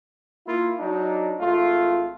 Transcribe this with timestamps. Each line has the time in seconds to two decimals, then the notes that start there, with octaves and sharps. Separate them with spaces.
0.47 A#3 E4 F4
0.79 F#3 D4 D#4
1.40 G#1 A3 F4